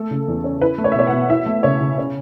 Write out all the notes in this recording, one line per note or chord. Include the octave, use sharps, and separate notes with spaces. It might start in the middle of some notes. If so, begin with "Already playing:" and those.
Already playing: A3 A4
C#3
E2
C#4
E4 B4
A3
C#5
E5
B2 C#5
F#5
B2
E4 E5
A3
C#3 C#5
C#3
C#4